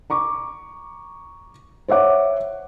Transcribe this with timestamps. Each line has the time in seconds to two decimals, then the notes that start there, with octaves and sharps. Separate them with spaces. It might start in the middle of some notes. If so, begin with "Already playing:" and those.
0.10 A#5 C#6 D6
1.88 C5 C#5 E5 F#5 D6